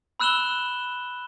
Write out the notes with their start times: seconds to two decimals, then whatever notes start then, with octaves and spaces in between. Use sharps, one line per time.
0.20 B5 E6 F#6 E7 F#7 G7